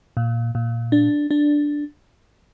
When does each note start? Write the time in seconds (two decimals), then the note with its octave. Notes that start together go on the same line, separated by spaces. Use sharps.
0.17 A#2
0.55 A#2
0.92 D4
1.31 D4